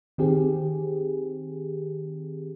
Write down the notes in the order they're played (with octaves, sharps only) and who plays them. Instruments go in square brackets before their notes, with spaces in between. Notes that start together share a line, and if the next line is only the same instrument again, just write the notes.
[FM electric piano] D#3 C4 G4 G#4